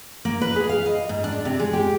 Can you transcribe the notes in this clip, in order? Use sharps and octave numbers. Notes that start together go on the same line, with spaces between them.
A#3
B4
G#4
F5
D#5
G#2
D4
C3
G#3
G4